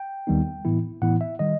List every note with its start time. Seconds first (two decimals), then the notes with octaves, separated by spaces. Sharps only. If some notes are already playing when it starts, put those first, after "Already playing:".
Already playing: G5
0.27 D#2 D#3 G3 B3 D#4
0.65 A2 E3 B3 E4
1.02 A2 E3 B3 E4 F#5
1.21 E5
1.39 D#3 G3 D#5